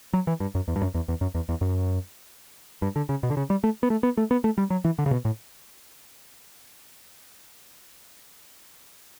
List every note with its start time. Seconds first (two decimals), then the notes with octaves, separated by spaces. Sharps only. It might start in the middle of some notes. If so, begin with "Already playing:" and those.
0.13 F#3
0.27 E3
0.40 G2
0.55 F#2
0.68 E2
0.76 G2
0.82 F#2
0.95 E2
1.08 E2
1.21 F#2
1.35 E2
1.49 E2
1.61 F#2
2.82 G2
2.96 D3
3.09 C#3
3.23 B2
3.30 D3
3.37 C#3
3.50 G3
3.64 A3
3.83 B3
3.90 A3
4.03 B3
4.17 A3
4.31 B3
4.44 A3
4.58 G3
4.70 F#3
4.85 E3
4.98 D3
5.06 C#3
5.11 B2
5.25 A2